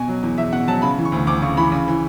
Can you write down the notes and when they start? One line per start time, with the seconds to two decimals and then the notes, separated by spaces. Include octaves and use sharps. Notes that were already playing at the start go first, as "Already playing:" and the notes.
Already playing: B2 G#5
0.08 F#3
0.23 E2
0.38 E2 E5
0.52 B2 F#5
0.67 F#3 A5
0.82 C#3 B5
0.98 E3
1.05 C#6
1.12 D2
1.27 D2 D6
1.42 C#3 C#6
1.57 E3 B5
1.72 C#3
1.88 E3